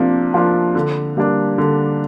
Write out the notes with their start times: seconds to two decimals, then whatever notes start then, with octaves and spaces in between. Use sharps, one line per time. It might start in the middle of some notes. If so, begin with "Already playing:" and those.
Already playing: C3 F3 A#3 D4 F4
0.34 F3 A#3 D4 F4
0.75 D3
1.17 G3 A#3 D4
1.58 D3